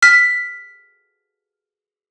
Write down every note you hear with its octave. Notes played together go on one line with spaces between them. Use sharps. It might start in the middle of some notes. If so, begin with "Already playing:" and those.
F6 B6